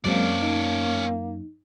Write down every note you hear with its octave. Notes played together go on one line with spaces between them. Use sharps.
F#2 F#3 G#3 A#3 C4 C#4 D5
D#4